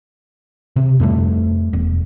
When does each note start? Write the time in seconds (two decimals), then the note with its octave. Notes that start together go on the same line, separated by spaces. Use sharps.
0.76 C3
1.00 F2 G3 A3
1.73 E1